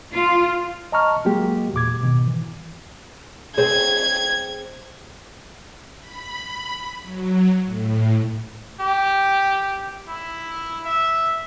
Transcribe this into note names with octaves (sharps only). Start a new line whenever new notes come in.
F4
D#5 A5 A#5 C#6 F6
F#3 G#3 A#3 F#4 G4
E2 A#2 D6 G#6
G#2 B2 D#3
E3
C4 G#4 G#6
B5
F#3
A2
G4
E4
E5